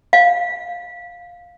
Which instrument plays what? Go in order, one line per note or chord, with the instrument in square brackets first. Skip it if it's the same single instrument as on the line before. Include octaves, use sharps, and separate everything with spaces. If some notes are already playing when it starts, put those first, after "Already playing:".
[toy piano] F5